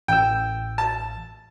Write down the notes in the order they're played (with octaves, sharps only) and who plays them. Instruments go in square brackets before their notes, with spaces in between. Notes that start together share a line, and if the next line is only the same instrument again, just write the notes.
[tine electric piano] A1 E6 [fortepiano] G5
[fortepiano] A5